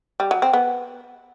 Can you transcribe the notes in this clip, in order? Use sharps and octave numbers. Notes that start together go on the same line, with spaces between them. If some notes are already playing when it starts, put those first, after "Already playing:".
G3
F#3
C4
B3